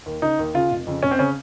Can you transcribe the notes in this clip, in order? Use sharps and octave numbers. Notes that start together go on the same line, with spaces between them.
D#2
C#3 D#4
D#2
C#3 F4
F1
F2 C#3
F1 C#4
C4
C#3 C#4